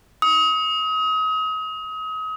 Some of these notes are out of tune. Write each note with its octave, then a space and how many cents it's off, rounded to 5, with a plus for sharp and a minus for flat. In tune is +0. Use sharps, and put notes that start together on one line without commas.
D#6 +35